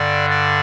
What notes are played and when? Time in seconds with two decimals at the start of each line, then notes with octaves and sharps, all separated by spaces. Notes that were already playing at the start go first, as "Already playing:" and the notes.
Already playing: G2 D3 D5
0.30 D5